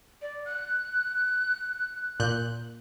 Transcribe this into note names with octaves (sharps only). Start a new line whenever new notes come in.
D5
F#6
A#2 F#6 G6